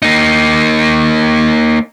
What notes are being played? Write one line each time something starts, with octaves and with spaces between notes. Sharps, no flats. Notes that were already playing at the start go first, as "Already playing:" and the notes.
A#3 D#4